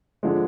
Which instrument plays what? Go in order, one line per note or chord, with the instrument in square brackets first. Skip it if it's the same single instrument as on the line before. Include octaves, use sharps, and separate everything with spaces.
[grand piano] D3 F3 G#3